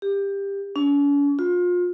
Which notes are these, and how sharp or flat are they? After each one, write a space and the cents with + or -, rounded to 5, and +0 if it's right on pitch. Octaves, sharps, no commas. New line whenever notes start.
G4 +20
C#4 +45
F4 +30